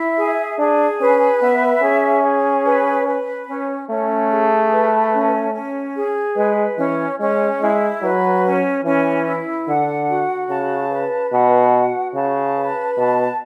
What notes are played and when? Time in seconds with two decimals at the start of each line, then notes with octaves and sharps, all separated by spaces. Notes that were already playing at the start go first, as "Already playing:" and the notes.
Already playing: E4 E5
0.18 G#4
0.59 D4 G#4
1.00 C#4 B4
1.41 B3 E5
1.82 C#4 G#4
2.24 G#4
2.65 B4
3.07 B4
3.48 C#4
3.89 A3 C#4
4.30 G#4
4.72 B4
5.12 C#4
5.54 C#4
5.96 G#4
6.37 G#3 B4
6.77 E3 C#4
7.19 G#3 C#4
7.61 G#3 E4
8.02 F#3 B4
8.44 C#4
8.84 E3 C#4
9.25 E4
9.67 D3 F#5
10.09 F#4
10.49 C#3 A5
10.91 B4
11.32 B2 F#5
11.73 F#4
12.14 C#3 A5
12.57 B4
12.97 B2 A5